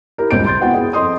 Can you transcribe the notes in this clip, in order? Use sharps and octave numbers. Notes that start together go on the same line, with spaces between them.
E4 G4 A#4
D#1 C#2 C4 C5 G6 D7
C6 G6 A6
B3 C4 E4 F#4 F#5 G5
B3 E4 G#4
F2 A4 D#5 C6 D#6